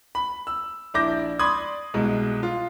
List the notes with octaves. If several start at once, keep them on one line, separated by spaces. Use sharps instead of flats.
B5
E6
A#1 D4 E4 D6 G6 A#6
D5 B5 C6 D#6 G#6
C2 B2 G#3
F4